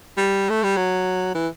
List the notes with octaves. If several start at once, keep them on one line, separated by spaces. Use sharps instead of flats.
G3
A3
G3
F#3
E3